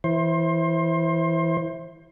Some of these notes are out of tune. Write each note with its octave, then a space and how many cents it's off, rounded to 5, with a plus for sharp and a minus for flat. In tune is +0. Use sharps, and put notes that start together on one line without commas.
E3 +0 C5 +25